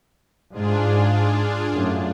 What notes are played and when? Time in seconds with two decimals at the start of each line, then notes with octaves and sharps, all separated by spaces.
0.52 G#2 D4 F4 G#4
1.73 F#2 A2